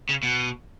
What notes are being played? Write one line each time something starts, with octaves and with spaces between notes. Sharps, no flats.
C#3
B2